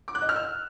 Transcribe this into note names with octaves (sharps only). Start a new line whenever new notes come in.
D6
F#6
D#5
F6
E6